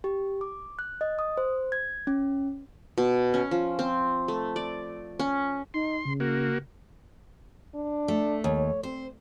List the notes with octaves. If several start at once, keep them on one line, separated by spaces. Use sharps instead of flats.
G4
D6
F#6
D#5
D#6
C5
G#6
C#4
B2
C#4
F3
C4
A3
D5
C#4
D#4 C6
C#3
C#3 A#3 F#4
D4
A3
D#2 C#5
C4 C5